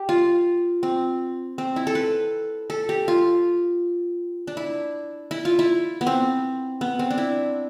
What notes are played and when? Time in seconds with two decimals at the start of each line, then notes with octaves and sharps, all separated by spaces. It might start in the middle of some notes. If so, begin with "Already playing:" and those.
Already playing: G4
0.09 F4
0.83 C4
1.58 C4
1.76 E4
1.87 A4
1.95 B4
2.70 A4
2.89 G4
3.08 F4
4.47 D4
4.57 E4
5.31 E4
5.45 F4
5.59 E4
6.01 B3
6.07 C4
6.81 B3
6.99 C4
7.11 D4
7.18 E4